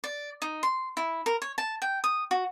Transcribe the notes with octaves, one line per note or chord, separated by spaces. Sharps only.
D5
D#4
C6
E4
A#4
C#5
A5
G5
D#6
F#4